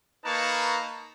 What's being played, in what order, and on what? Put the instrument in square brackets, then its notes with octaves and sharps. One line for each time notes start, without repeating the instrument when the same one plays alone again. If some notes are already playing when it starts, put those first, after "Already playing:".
[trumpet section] A#3 D#4 B4 A5 A#5 C#6